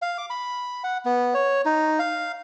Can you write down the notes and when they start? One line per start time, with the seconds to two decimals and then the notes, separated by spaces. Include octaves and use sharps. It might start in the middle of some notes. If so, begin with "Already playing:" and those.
0.02 F5
0.18 D6
0.30 B5
0.84 F#5
1.05 B3
1.34 C#5
1.65 D#4
1.99 F5